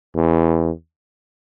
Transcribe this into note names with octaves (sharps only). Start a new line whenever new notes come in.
E2